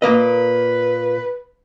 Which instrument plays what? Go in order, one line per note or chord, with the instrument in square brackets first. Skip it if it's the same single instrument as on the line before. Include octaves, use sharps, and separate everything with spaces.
[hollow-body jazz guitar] A#2 A#3 D#5 [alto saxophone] B4